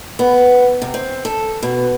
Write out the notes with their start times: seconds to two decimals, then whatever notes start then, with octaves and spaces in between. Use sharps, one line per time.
0.19 B3
0.82 C3
0.94 C4
1.25 A4
1.63 B2